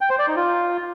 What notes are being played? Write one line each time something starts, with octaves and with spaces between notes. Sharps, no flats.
G5
C5
D5
D#4
F4